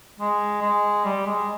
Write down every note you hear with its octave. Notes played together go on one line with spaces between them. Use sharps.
G#3
G#3
G3
G#3